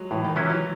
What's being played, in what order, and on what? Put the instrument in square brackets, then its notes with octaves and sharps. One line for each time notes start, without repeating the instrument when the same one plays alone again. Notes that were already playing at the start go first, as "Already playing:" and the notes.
Already playing: [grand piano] F#3 G#3
[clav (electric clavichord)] A2 [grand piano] E3
[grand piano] D#3
[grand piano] E3 [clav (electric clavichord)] F#3 C#4 E4
[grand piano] F#3